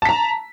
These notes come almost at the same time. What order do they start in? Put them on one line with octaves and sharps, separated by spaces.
A5 B6 A#5